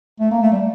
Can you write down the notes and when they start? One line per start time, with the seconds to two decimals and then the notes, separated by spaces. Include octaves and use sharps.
0.20 A3
0.31 A#3
0.42 A3
0.52 G3